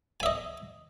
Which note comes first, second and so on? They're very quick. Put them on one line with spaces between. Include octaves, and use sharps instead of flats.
G#5 E5 D#5